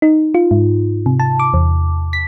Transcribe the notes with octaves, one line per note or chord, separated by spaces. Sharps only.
D#4
F4
G#2
C3
A5
D6
E2
B6